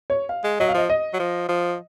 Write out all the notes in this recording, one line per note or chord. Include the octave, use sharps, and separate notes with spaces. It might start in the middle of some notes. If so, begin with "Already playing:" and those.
C#5
F5
G#3
F#3 D#5
F5
F3 D#5
D#5
F#3
F3
F3